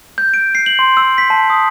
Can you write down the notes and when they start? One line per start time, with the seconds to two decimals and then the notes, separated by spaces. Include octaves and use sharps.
0.18 G6
0.34 D7
0.55 C7
0.66 F#7
0.79 C6
0.97 E6
1.18 B6
1.30 A5
1.50 D#6